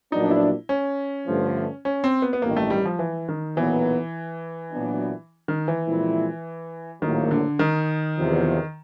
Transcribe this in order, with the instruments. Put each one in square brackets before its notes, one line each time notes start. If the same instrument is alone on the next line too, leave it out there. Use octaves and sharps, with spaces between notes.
[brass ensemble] A#1 A#2 F#3 B3 D4 [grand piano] D#4
[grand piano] E4
C#4
[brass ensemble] G2 D3 F3 A3
[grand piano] C#4
C4
B3
B3
[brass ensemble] A1 G2 D#3 [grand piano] A#3
[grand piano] A3
G3
F3
E3
D#3
[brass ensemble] B1 A#2 F#3 B3 [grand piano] E3
[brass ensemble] A#2 F#3 B3 D4
[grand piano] D#3
E3
[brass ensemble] A#2 F3 G#3 C4 E4
[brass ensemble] A#1 A2 F#3 A#3 [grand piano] D#3
[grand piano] D3
D#3
[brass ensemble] E2 C3 F3